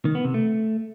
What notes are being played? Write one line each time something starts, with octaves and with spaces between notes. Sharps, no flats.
D#3
B3
C3
A3